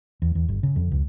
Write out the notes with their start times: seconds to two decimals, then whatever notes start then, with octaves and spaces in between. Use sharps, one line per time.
0.22 E2
0.35 E2
0.49 G1
0.63 C#3
0.76 F2
0.92 C#2